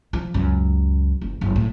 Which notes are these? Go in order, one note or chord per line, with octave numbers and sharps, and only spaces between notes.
F3
C#2 F#2
F#1
F#1 F#3
A2